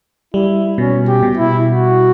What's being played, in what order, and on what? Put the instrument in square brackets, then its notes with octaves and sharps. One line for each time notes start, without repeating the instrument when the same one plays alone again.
[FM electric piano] G3 [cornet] E4
[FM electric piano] B2 [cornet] C#4
[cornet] G4
[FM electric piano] B2
[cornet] E4
F#4